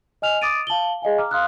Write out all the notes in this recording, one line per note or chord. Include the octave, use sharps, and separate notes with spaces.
D#5 G#5 F6 F7
D6 D#6 A6 D7 D#7
F5 A5 F#7 G7
G#4 D#5 F5 G#5
A#5 D6 F6
F5 C6 D#6 F6 F#6